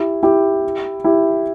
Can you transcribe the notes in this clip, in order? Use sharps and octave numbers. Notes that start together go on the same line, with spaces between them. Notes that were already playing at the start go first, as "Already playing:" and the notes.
Already playing: E4 G4
E4 G4
E4 G4